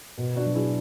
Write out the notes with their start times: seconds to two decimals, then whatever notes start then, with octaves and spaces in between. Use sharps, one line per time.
0.18 B2
0.36 D4 F#4
0.46 F#3
0.55 E4 G#4